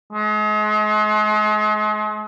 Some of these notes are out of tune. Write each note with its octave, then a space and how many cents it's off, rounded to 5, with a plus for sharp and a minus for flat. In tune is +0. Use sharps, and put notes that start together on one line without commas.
G#3 +40